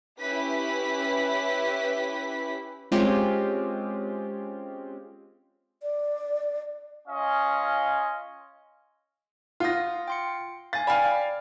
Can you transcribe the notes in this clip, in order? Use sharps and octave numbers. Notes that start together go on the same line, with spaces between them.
C#4 E4 G4 B4 B6
G#3 C4 C#4 F4 G4
D5
C#4 F4 D#5 F5 G#5
F4 F#5 D#6 A#6
G5 C6 C#7
F5 G#5 A6
D5 F5 G5 G#5 B5